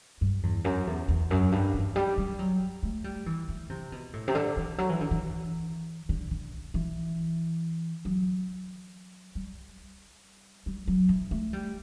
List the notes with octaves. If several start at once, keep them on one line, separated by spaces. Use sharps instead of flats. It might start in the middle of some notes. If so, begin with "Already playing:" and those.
G2
E2
F#2
E2
E2
F#2
G2
E3
G3
G3
F#3
A3
G3
E3
E3
C3
B2
A2
C3
D3
E3
F#3
E3
D3
E3
D3
D3
E3
F#3
G3
G3
F#3
E3
A3
G3